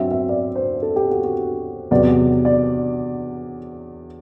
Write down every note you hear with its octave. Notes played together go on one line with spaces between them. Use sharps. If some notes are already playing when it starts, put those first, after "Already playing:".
Already playing: G2 F#3 C4 E5
E5
D5
C5
A4
G4
F#4
F#4
E2 C3 F#3 D5
D5